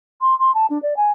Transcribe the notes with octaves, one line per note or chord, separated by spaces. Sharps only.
C6
C6
A5
D4
D5
G#5